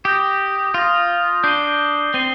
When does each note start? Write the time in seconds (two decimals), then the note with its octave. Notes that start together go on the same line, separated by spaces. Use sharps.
0.05 G4 D#6 G6 A#6
0.74 F4 D#6 G6 A#6
1.43 D4 G6 C7 D#7 G7
2.14 C4 G6 C7 D#7 G7